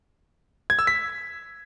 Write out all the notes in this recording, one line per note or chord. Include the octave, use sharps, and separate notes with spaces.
G#6
E6
B6